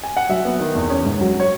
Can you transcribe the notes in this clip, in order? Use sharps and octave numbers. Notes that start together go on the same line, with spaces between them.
G#5
F#5
F#3 E5
B3
D#3
E2
C#4
G#2
F#3
C#5